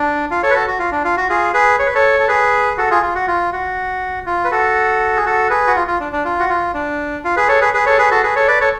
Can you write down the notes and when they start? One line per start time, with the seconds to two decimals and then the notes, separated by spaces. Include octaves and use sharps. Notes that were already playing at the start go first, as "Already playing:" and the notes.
Already playing: D4
0.31 F4
0.43 A4 C#5
0.51 B4
0.54 F#4 A4
0.67 F#4
0.79 F4
0.92 D4
1.04 F4
1.17 F#4
1.29 F4 G#4
1.53 G#4 B4
1.79 C#5
1.86 B4
1.95 A4 C#5
2.20 A4
2.28 G#4 B4
2.78 F#4 A4
2.91 F4 G#4
3.03 F4
3.15 F#4
3.28 F4
3.53 F#4
4.26 F4
4.45 B4
4.51 F#4 A4
5.17 G#4
5.25 F#4 A4
5.50 G#4 B4
5.67 F#4
5.76 F4
5.87 F4
6.00 D4
6.13 D4
6.25 F4
6.40 F#4
6.49 F4
6.74 D4
7.24 F4
7.36 G#4 B4
7.48 A4 C#5
7.61 G#4 B4
7.73 G#4 B4
7.86 A4 C#5
7.98 G#4 B4
8.11 F#4 A4
8.23 G#4 B4
8.36 A4 C#5
8.48 B4 D5
8.61 A4 C#5